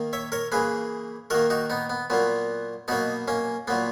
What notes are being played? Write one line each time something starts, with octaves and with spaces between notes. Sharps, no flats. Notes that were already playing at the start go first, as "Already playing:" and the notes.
Already playing: D#3 A#3
C#5 E5
A#4 C#5
C#3 E3 A#3 G#4 B4
D#3 A#3 F#4 A#4
D#4 F#4
B3 D#4
B3
A#2 F#3 A#3 B3
B2 F#3 A#3 B3 D#4
A#3 C#4
A#2 F#3 A#3 B3